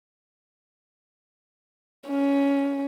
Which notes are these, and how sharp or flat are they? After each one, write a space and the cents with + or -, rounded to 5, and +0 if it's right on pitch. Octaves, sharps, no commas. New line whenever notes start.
C#4 +10